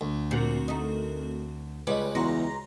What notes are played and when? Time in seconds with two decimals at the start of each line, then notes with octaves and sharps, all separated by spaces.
0.01 D2
0.31 A#2 C4 F#4 A#4
0.68 A3 D#4
1.87 C#2 G3 B4 C#5 D#5 D6
2.15 E2 F#4 A#5 C6 A#6